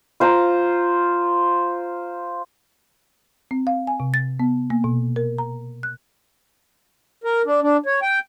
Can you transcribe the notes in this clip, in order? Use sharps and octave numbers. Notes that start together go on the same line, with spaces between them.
F4 C5 F5 A#5
C4
F5
G#5
C3
A6
B3
A#3
B2
A#4
A#5
F#6
A#4
D4
D4
C#5
G5